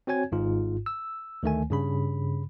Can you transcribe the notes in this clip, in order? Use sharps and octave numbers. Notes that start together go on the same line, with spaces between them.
C4 F#4 C#5 G#5 G#6
G#1 G#2 F4
E6
D2 D#3 A3 G#5
G2 C#3 B5